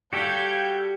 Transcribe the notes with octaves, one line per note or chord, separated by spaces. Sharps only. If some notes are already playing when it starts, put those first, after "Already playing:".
G3 F#4 G4 A4 F5 G6 G#6